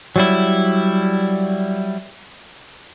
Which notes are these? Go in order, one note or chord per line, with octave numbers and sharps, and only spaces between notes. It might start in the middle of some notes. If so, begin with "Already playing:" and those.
F#3 G3 E4